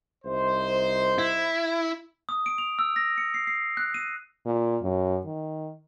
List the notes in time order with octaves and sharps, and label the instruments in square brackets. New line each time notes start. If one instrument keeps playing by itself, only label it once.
[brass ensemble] C2 D#4 C5
[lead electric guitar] E4
[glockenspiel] D#6
D7
F7
E6
A#6
C#7
C7
C7
F#6
D#7
[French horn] A#2
F#2
D#3